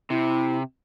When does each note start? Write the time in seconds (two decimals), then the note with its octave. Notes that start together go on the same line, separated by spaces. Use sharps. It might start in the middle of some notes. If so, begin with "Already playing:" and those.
0.10 C3 E4